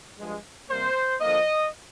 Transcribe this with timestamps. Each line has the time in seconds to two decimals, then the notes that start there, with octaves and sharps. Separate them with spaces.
0.19 G2 F3 G#3
0.70 C3 G3 A#3 C5
1.20 D3 F3 A#3 D#5